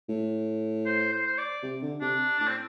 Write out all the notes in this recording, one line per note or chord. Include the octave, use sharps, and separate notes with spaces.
A2
C5
C5
C5
D5
C3
D3
C3 D4
A2 D4
C4